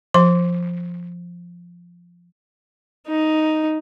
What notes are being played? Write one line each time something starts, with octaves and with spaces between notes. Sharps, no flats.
F3 C6
D#4